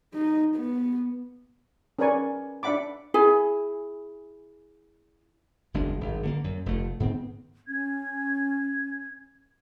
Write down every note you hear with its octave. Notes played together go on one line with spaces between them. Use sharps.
D#4
B3
C#4 A#4 B4 D5 G#5 C#6
D4 D5 E5 F#5 B5 D6
E4 G#4 G#5
F#1 E2 G#3 D4
G#1 G2
D3 A3 A#3
F#2
F1 A3
G#2 D#3 B3 C4
C#4 G#6